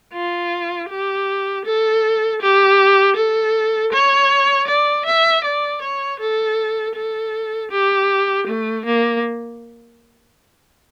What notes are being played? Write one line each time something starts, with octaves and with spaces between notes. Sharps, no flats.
F4
G4
A4
G4
A4
C#5
D5
E5
D5
C#5
A4
A4
G4
A3
A#3